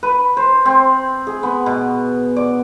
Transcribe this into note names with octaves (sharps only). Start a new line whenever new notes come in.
B4
C5
C4
G#4
B3
B2
D5